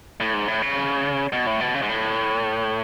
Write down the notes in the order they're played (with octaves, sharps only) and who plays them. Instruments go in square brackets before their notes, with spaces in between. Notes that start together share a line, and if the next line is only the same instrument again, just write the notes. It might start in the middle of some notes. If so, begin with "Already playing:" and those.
[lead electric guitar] A2
G#2
A2
C#3
B2
A2
B2
C#3
G#2
A2